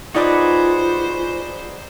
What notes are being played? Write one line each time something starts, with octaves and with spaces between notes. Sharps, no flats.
D#4 F4 F#4 G#4 B4 C5 D5 D6